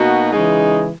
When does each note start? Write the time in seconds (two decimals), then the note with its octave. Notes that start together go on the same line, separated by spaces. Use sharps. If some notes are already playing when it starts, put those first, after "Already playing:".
Already playing: B2 A#3 D#4 F#4
0.31 C#3 E3 G#3 D#4 G#4